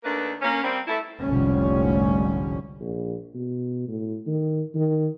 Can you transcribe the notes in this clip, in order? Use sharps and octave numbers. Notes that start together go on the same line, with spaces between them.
D#2 A3 A#3 D4 B4
A#3 C#4
G3 A#3 C4
A3 E4
F1 C2 G#2 D3 G3 C#4
A#1
B2
A2
D#3
D#3